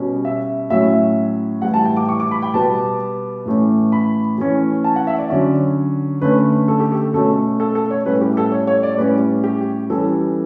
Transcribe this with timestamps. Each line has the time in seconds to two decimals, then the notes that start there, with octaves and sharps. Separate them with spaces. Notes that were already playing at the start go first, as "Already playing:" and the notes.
Already playing: B2 G3 C#4
0.25 E5
0.70 A2 F#3 C#4 E5
1.62 A2 E3 G3 F#5
1.74 A5
1.85 G5
1.97 D6
2.09 C#6
2.20 D6
2.31 B5
2.42 G5
2.54 B2 G3 B3 A5
3.46 A2 E3 A3 C#4
3.92 B5
4.38 E3 A3 C#4
4.84 A5
4.96 F#5
5.07 E5
5.18 D5
5.30 D3 F#3 C#4
6.21 D3 A3 C#4 B4
6.68 A4
6.80 G4
6.92 A4
7.14 B2 A3 C#4 A4
7.60 A4
7.75 A4
7.90 C#5
8.06 A2 G3 C#4 B4
8.21 G4
8.37 A4
8.52 C#5
8.67 C#5
8.83 D5
8.97 A2 G3 C#4 B4
9.44 G4
9.90 E3 G3 C#4 A4